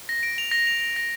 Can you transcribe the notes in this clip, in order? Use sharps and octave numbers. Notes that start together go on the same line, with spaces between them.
A#6
D7
F7
A#6
F7
A#6
A#6